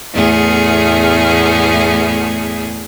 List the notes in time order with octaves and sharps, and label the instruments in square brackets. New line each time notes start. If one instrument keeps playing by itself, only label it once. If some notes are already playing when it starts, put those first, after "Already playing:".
[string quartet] E2 A2 A3 B3 G#4